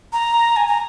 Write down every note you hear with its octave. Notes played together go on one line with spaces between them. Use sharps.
A#5
G#5
A#5